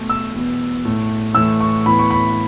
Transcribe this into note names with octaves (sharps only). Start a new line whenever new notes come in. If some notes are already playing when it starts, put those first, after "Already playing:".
Already playing: B2 A3
E6
E2 B2 B3
A2 A3
A2 E3 A3 E6
C#6
A2 E3 B3 B5
C#6
B5